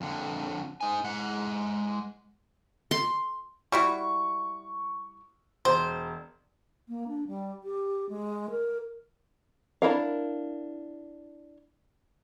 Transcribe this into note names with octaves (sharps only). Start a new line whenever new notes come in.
F2 D3
D#4 G#5
G#3 F#5
C6
G3 E4 F#4 C#6
E1 C5
A#3
D4
G3
G4
G#3
A#4
D4 E4 A#4 F5